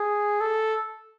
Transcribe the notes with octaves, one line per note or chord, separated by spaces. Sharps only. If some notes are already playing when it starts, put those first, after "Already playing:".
Already playing: G#4
A4